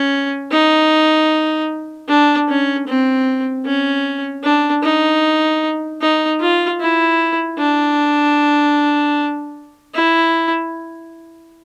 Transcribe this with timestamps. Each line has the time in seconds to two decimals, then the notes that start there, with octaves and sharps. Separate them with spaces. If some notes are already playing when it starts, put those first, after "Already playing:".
Already playing: C#4
0.52 D#4
2.09 D4
2.49 C#4
2.87 C4
3.66 C#4
4.44 D4
4.83 D#4
6.01 D#4
6.41 F4
6.80 E4
7.59 D4
9.95 E4